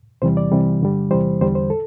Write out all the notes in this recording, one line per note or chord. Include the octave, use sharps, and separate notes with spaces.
E2 C3 E3 G3 C5
D5
C2 C3 E3 G3
G2 D3 G3
E2 C3 E3 G3 C5
E2 D3 G3 C5
C5
A4